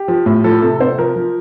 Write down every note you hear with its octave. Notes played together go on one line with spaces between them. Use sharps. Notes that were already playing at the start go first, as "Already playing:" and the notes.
Already playing: G4
F3
A2
F3 A4
C3 A4
C3 C5
F3 A#4
F3